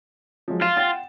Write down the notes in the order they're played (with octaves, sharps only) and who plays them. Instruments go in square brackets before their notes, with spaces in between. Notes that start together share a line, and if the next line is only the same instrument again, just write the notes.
[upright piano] F3 F#3 G#3
[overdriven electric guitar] F4 [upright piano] E7
[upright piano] F#5 G5 A6